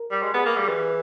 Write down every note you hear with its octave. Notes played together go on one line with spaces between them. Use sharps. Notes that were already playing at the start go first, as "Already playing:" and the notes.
Already playing: A#4
G3
G#3
B3 G#4
A#3
G3
E3